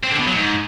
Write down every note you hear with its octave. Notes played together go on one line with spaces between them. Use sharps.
C4
D3
B2
F#3
G#2